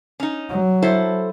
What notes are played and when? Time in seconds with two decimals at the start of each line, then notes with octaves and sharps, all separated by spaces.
0.20 C#4 D#4
0.50 F#3
0.82 E4 A4 C5